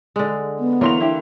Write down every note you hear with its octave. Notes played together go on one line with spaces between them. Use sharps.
D3 G#3
B3
E3 A#3 A#4 C#5 C6 F7
D4 E4 G4